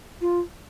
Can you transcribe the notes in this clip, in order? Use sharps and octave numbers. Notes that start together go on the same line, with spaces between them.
F4